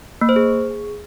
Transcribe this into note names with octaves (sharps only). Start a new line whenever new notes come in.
A#3
C5
G#4